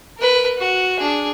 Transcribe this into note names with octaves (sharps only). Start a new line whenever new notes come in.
A#4 B4
F#4 F#5
D4 G#4